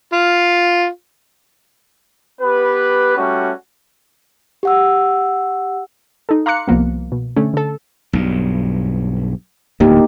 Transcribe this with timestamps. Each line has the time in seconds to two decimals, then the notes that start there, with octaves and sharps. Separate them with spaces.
0.13 F4
2.40 B3 G4 B4
3.17 G3 A3 C#4 F#4
4.63 G4 F#5 E6
6.29 D#4 A4
6.46 F5 A#5 C6 D6 F#6 C#7
6.68 C2 F3 A#3 B3
7.12 B2
7.36 D3 A3 C#4
7.54 D3 A4
8.13 B1 G2
9.80 D1 D2 G#2 A#3 D#4 G4